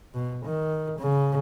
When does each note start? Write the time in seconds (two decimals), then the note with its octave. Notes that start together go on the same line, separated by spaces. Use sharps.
0.14 B2
0.45 D#3
0.98 C#3